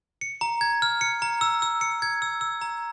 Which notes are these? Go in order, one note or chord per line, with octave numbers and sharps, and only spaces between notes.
C#7
A#5
G#6
F6
C#7
A#5
E6
E6
C#7
G#6
E6
E6
A#5